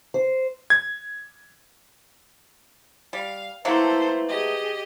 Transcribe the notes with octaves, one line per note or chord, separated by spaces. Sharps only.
C5
G#6
G3 F5
F#3 A3 A#3 E4 A4 B4 C5
G4 G#4 D#5